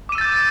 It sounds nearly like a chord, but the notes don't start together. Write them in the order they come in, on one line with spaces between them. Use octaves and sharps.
D6 D#7 E6 A6 G6